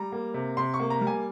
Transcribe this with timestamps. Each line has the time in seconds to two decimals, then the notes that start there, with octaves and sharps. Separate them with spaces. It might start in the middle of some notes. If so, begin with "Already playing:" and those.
Already playing: G3 A#5
0.12 A#3
0.34 C3
0.57 C3 C6
0.74 C#6
0.80 A#3
0.90 A#5
1.01 G3
1.07 G#5